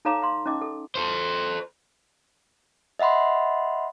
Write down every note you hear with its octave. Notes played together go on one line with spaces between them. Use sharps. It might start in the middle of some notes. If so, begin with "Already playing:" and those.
D#4 A4 C#5 F5 A#5 D6
F5 C6
C#4 D#4 D#5 D6
A4
A4 C5
D#5 E5 F#5 B5 C6